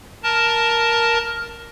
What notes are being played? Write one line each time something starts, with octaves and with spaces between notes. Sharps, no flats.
A#4 A5